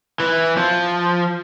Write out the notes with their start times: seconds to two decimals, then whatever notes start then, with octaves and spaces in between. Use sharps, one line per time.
0.20 E3
0.57 F3